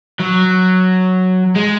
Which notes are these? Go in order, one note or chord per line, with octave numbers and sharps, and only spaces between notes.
F#3
G#3